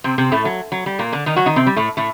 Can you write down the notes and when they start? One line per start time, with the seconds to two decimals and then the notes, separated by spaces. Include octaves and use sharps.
0.04 C3 C4
0.18 C3 C4
0.32 A2 A3
0.45 F#3
0.72 F#3
0.86 G3
0.99 A#2 A#3
1.13 D3 D4
1.26 D#3 D#4
1.36 F#3 F#4
1.46 D#3 D#4
1.56 C3 C4
1.67 G3
1.76 A2 A3
1.97 A2 A3